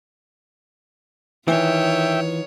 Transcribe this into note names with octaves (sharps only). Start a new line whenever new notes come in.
D#3 E3 F4 C#5 E5 G5